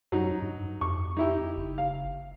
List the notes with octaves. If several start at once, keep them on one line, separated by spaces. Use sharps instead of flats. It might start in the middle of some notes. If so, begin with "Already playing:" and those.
F#2 F#3 D#4
G2
F2 C#6
D#4 E4 G4
F#1
F5